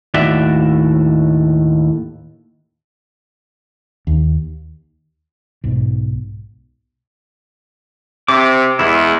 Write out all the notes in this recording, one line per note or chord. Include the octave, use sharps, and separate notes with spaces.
D#2 A2 F#4 D5 E5
D#2
B1 G#2
C3 D6
E2 G#3 E4